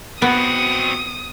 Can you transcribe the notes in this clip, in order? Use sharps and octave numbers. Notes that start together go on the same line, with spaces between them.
B3 C4 F#4 D#6